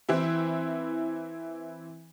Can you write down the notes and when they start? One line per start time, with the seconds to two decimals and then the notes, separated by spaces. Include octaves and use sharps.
0.09 E3 C4 E4